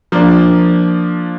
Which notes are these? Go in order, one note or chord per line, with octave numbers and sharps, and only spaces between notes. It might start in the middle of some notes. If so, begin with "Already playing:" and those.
F3 A#3 D4